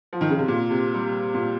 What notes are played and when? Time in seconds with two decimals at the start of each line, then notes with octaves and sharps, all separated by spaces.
0.13 F3
0.21 D#3
0.30 C#3
0.39 C3
0.48 A#2
0.70 C3
0.94 G3
1.34 A#2